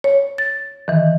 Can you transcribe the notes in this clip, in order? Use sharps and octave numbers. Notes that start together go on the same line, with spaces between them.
C#5
A6
D#3 E3